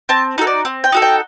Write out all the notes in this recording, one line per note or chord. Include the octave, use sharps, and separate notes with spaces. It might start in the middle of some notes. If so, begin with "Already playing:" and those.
C4 A5
D#4 F#4 A4
D5
C4
G5
D#4 F#4 A4
G5